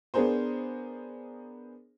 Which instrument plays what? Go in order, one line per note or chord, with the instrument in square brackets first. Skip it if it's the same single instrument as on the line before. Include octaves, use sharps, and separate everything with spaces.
[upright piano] B3 D4 G#4 A#4 C5